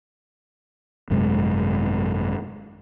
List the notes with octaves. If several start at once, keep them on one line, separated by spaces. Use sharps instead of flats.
G#1 F#2 C3 G#3